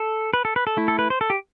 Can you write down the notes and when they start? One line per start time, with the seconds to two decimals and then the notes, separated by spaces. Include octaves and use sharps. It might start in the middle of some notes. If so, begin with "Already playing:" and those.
Already playing: A4
0.34 B4
0.45 A4
0.56 B4
0.67 A4
0.77 A3 E4
0.88 A4
0.99 B4
1.10 C5
1.21 A4
1.30 G4